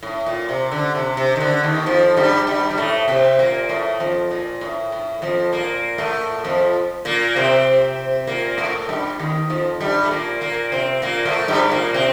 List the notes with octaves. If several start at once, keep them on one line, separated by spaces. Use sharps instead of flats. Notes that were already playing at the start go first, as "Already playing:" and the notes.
A2
A#2
C3
D3
C3
C3
D#3
D3
D#2 D#3
F2 F3
G2 G3
G2 G3
G3
A2 A3
C3 C4
A#2 A#3
A2 A3
F2 F3
A#2
A2
A2
F2 F3
A#2 A#3
A2 A3
F2 F3
A#2 A#3
C3 C4
A#2 A#3
A2 A3
G2 G3
D#2 D#3
F2 F3
G2 G3
A3
A#2 A#3
A#2 A#3
C3 C4
A#2 A#3
A2 A3
G2 G3
A#2 A#3
C3 C4